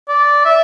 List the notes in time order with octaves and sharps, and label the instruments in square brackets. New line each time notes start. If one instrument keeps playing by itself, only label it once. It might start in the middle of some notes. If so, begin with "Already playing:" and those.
[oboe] D5
E5